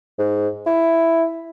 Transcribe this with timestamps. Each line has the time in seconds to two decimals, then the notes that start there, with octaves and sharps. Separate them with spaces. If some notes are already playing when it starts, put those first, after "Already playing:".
0.19 G#2
0.66 E4